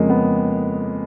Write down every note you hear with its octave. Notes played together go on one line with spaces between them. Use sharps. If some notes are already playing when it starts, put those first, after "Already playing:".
Already playing: F2 C#3 F3 G#3 A#3
B3